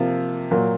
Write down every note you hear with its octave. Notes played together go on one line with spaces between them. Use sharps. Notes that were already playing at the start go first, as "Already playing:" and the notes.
Already playing: C3 F3 A#3 F4
A#2 F#3 A#3